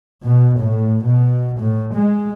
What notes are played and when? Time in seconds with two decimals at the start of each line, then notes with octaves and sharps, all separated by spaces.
0.24 B2
0.59 A2
1.05 B2
1.61 A2
1.94 G#3